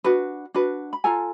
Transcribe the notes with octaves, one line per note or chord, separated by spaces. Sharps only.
D4 F#4 B4
D4 F#4 B4
B5
F4 A4 G#5 A#5